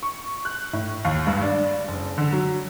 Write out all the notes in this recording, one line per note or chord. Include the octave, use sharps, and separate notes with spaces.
C#6
F#6
A2
D#2
G2
D4
F#1
D3
F#3